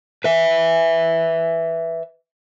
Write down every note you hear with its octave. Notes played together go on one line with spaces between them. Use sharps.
B4 E5